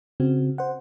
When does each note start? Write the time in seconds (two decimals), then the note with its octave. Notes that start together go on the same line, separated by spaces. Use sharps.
0.20 C#3 C4 F#4
0.58 C5 F#5